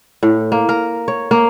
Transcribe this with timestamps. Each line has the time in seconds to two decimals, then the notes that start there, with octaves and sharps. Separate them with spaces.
0.23 A2
0.52 A#3
0.69 A#4
1.08 C#5
1.31 A#3